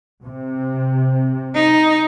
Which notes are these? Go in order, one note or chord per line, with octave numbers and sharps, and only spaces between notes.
C3
D#4